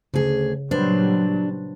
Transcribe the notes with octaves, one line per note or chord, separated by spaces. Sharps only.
D2 C#3 G#4
A#2 F#3 G3 D4 B4 C5